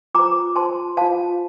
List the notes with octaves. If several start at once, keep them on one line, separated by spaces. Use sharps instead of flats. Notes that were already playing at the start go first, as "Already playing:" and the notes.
F4 C5 A#5 D6
F4 C5 A5 C6
F4 C5 F5 A5